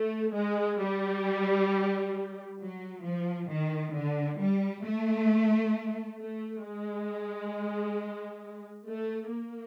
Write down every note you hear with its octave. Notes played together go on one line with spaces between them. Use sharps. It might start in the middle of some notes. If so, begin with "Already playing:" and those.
Already playing: A3
G#3
G3
F#3
F3
D#3
D3
G3
A3
A3
G#3
A3
A#3